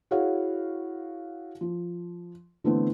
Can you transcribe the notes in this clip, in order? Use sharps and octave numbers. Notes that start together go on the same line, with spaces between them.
E4 F#4 G#4 C#5 F5 F#5
F3
D3 E3 A3 B3 C4